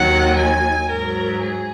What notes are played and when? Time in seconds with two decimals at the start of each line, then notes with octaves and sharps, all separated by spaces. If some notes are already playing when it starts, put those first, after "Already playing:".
Already playing: D#2 D#3 F#3 F#5
0.37 G#5
0.89 G#2 F#3 A#4
1.42 G#4